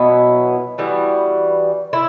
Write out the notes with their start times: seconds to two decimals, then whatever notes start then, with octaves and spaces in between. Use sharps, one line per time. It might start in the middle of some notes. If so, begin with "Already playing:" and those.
Already playing: B2 F#3 B3 E4
0.78 E3 G3 B3 F#4
1.93 E4